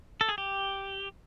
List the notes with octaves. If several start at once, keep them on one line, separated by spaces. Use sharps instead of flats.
A4
G#4
G4